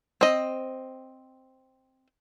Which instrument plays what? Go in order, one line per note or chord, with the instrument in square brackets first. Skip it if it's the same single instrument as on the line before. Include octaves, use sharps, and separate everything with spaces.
[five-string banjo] C4 D#5